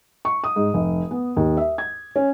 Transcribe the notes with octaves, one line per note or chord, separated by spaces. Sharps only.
C#6
D#6
G#2
F1
B3
D#2
E5
G#6
C#4